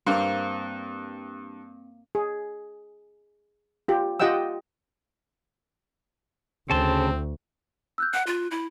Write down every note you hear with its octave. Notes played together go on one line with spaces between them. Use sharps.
G2 A#3 C4 F5
G#4
F4 G4
F4 G4 D#5 F#5 G5 E6
D2 C#3 C4 A5 C6
E6 F#6 G6
F#5 F#6
F4
E4